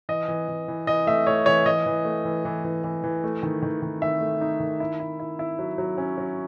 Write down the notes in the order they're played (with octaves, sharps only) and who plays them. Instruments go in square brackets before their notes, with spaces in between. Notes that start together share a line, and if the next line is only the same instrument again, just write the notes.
[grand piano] E3 D#5
E3
E3
E3
E3 D#5
A3 E5
A3 C#5
E3 C#5
E3 D#5
E3
A3
E3
E3
E3
E3
E3
A3
D#3
D#3
D#3
D#3 E5
A3
D#4
D#3
E4
E4
E4
E4
F#3
F#3
C#4
F#3